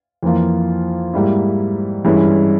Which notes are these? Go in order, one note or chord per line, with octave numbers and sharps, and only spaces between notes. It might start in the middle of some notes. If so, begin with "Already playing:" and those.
F2 E3 A#3 F4
G#2 G3 A#3 E4
G2 E3 G#3 C#4 E4